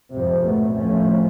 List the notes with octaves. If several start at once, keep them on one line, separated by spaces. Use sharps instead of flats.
F2 G#2 C3
F#2 A#2 A3 B3
D#2 A2 F3 A3 C#4